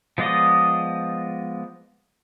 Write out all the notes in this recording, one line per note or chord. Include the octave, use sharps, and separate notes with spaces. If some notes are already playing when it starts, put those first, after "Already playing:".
F3 G#3 B3 D5 D#5